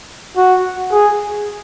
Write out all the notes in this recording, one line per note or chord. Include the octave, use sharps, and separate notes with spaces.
F#4
G#4